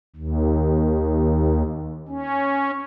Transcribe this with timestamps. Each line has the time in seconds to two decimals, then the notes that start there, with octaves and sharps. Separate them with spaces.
0.16 D#2
2.08 C#4